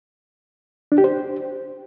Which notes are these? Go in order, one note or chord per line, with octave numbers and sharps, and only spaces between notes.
D4
G4
C5